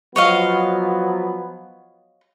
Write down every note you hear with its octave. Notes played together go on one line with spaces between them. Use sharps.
F3 F#3 B3 C#5 D#5 F5